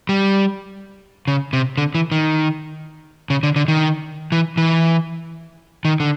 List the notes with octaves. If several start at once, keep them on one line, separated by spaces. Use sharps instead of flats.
G3
C#3
C3
D3
E3
D#3
C#3
D3
D3
D#3
E3
E3
D#3
D3